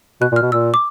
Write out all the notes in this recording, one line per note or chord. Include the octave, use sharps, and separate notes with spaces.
B2 F#6
A#2
F6
B2
A#2 E6
D6